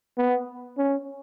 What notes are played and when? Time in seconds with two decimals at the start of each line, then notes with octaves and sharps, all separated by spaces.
0.18 B3
0.78 C#4